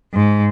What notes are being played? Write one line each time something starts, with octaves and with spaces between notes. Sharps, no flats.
G#2